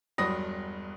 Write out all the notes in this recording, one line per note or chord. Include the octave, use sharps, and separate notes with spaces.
E1 G2 F#3 B5 D#6 A#6